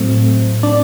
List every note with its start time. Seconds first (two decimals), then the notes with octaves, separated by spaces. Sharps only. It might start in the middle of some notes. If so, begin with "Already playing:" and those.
Already playing: A2 F#3 A3 C4
0.63 D4 D5